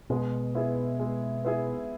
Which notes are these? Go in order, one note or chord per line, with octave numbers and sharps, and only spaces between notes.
B2 G#3
B3 E4 G#4
G#3
B3 E4 G#4